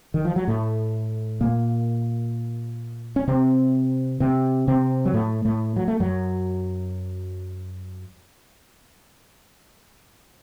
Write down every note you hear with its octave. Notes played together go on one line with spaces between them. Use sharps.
D#3
F3
F#3
A2 A3
A#2 A#3
C#4
C3 C4
C3 C4
C3 C4
F#3
A2 A3
A2 A3
F#3
A3
F#2 F#3